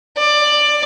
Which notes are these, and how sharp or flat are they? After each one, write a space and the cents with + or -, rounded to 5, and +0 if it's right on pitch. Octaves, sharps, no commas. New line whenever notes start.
D5 +15